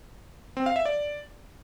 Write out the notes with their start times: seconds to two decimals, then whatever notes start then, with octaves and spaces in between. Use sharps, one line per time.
0.57 C4
0.66 F5
0.76 E5
0.85 D5